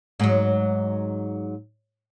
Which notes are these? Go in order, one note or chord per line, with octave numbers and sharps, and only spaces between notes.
G#2 F#3